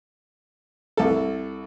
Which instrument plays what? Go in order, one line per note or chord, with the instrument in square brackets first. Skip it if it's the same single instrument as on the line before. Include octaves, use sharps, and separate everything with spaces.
[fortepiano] C2 A4